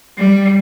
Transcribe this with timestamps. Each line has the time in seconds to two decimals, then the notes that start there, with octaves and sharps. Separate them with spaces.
0.17 G3